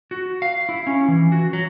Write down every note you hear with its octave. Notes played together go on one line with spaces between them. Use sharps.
F#4
F5
E4
C#4
E3
F#4
F#3